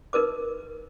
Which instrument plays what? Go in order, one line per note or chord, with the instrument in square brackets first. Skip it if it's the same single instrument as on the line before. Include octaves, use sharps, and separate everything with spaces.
[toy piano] D#4 A#4 B4 D6